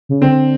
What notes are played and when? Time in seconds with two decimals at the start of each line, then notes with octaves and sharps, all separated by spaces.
0.09 C#3
0.21 D3 C4